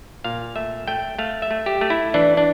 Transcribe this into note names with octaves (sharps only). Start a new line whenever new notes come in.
A#2 F5
A3 E5
A3 G5
A3 F5
E5
A3
G4
A3
E4
E3 D4
D4